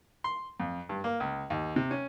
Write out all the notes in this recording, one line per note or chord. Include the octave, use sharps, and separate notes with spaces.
C6
F2
G2
A#3
C#2
D#2
C3
C#4